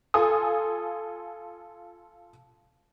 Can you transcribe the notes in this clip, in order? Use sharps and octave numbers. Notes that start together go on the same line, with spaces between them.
F4 A4 G#5 D#6